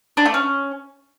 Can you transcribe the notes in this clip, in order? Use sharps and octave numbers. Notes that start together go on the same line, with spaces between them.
D4
A3
C#4